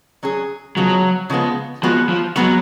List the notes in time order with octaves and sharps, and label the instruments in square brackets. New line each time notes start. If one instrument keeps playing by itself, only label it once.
[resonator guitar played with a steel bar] F#3 C#4 G#4
[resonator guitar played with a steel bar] C#3 F3 G#3 B3 [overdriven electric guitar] F#3
[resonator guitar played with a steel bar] C#3 F3 G#3 B3
[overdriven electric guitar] F3 [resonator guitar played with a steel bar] G#3 B3 F#4
[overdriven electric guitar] F3
[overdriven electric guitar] F#3 [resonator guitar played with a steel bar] G#3 B3 F#4